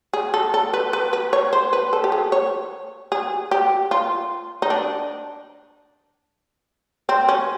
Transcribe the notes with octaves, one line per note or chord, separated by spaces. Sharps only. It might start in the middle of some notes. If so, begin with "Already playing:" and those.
G#4
A4
A4
B4
B4
B4
C#5
C5
B4
A4
G4
G#4
C#5
G#4
G4
F4
D#4
D4
C4
C#4